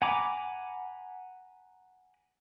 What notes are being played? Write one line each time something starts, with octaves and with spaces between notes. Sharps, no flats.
F#5 G#5 A#5 B5 D6